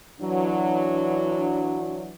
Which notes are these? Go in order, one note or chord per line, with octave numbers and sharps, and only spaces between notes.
E3 F#3 D4